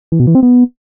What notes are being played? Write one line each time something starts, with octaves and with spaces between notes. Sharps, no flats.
E3
B2
E3
C4
B3